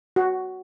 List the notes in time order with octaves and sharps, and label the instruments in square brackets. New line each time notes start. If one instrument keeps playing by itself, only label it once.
[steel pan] F#4